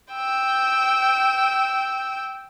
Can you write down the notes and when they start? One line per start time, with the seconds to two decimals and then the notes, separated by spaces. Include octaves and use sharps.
0.13 G5 E6